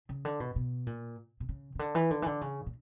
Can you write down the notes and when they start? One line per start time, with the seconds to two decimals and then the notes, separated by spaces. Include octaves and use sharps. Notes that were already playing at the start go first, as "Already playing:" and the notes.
0.09 C#3
0.25 D3
0.40 B2
0.56 B2
0.87 A#2
1.40 B2
1.49 C#3
1.75 C#3
1.79 D3
1.95 E3
2.11 D3
2.22 E3
2.26 D3
2.41 C#3
2.66 A#2